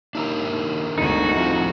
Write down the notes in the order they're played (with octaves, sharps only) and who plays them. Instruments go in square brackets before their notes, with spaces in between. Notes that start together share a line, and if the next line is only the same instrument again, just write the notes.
[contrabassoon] D#2 [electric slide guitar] D4 E4 A#4
[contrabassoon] D#2
[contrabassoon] E1 [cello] D2 F#4 [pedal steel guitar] D#4
[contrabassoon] C2 [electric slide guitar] A2 F3 F4